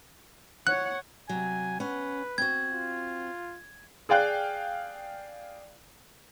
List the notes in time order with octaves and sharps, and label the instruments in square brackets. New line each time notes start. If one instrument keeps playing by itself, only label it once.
[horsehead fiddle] C#5 F#5 [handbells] F#6
[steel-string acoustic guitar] C3 F#3 [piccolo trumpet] G#5
[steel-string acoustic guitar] C#4 F#5 [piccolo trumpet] B4
[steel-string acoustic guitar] C4 F#4 [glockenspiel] G#6
[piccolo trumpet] F4
[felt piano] G#4 D5 F5 G5 F#6